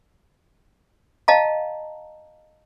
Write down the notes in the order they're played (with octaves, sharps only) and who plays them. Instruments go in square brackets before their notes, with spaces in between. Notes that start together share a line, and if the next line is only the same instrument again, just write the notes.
[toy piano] D#5 F5 A5 A#5